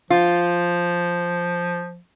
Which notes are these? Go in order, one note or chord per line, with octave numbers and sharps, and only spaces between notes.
F3 F4